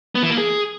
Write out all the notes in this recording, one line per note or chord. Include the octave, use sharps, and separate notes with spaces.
B3
E3
A#3
G#4